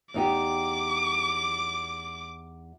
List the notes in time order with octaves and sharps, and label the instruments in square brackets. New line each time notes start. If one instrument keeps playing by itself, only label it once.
[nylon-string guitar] E2 D#4 G4 [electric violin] D6